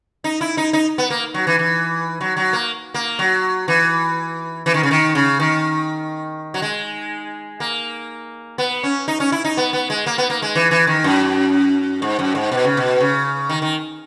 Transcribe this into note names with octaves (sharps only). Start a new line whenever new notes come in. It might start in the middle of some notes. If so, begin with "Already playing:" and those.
D#4
E4
D#4
D#4
B3
A#3
F#3
E3
E3
F#3
F#3
A#3
A#3
F#3
E3
E3
D#3
C#3
D#3
C#3
D#3
F#3
G#3
A#3
B3
C#4
D#4
C#4
E4
D#4
B3
B3
G#3
A#3
B3
A#3
G#3
E3
E3
D#3
F#2
G#2
F#2
G#2
B2
C#3
B2
C#3
D#3
D#3